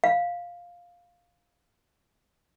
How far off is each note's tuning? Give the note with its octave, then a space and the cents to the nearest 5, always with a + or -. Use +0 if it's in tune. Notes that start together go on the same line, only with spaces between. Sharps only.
F5 +5